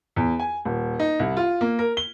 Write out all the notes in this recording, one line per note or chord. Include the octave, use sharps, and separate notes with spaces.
E2
G#5
D#1
D#4
C2
F4
A#3
A#4
G7